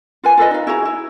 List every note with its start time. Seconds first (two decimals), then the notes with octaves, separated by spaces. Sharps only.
0.24 F4 B4 G#5
0.37 F4 A4 B4 D#5
0.51 D#4 F5
0.67 E4 F#4 G#4 A#5
0.85 E4